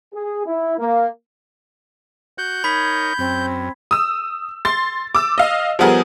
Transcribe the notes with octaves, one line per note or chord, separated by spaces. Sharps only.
G#4
E4
A#3
F#4 F#5 G6
D#4 A#4 C#5 B5 G#6 B6
F#2 C4
D#6 E6
C6 A6
D6 E6
D#5 F5
F3 G3 B3 G#4 A#4